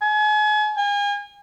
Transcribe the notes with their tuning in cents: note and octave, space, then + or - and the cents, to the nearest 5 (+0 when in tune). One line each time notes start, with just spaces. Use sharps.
G#5 +35
G#5 -35